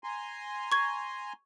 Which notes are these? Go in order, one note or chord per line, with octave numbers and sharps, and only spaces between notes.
G#5 A#5 C6
C#6 G#6